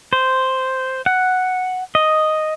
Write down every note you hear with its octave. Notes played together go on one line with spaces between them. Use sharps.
C5
F#5
D#5